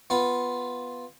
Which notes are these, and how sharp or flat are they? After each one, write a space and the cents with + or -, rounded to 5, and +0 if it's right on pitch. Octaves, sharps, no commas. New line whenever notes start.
B3 +0 F4 +0